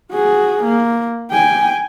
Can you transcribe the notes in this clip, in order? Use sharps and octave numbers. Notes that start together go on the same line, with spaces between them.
F#4 G#4
A#3
G5 G#5